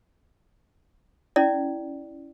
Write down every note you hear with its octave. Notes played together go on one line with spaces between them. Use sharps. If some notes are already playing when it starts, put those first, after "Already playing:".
C#4 E4 D5